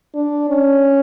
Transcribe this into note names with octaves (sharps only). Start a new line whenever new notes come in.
D4
C#4